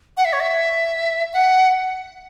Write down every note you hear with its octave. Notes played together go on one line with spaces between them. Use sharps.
F#5
E5
C#5
E5
F#5